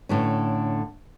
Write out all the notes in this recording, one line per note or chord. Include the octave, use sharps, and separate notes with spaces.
A2 D3 C#4